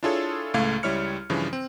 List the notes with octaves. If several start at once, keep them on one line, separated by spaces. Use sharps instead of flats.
D4 E4 F4 G#4 A4 C#5
C#2 A2 A3 F5 G#6
C#2 G3 E4 C#5 F6 C#7
G2 C#3 E3 F3
C4